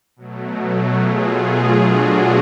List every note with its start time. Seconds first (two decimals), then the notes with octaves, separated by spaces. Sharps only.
0.16 B2 F#3 A3
0.94 F4 G#4
1.73 D4 F#4